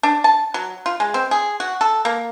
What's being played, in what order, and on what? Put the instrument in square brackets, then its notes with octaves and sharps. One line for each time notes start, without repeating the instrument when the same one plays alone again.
[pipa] D4
A5
F#3
F4
G#3
C4
G#4
F#4
A4
A#3